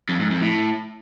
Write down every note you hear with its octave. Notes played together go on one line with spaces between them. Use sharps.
F2
G#2
F2
A2